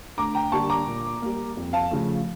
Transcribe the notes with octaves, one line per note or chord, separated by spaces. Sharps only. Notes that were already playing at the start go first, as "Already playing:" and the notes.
D2 A#5 D6
G5 A#5
D3 G3 A#3 A5 C#6
A#5 D6
A#2
G3 A#3
F2
F5 A5
C#3 F3 A3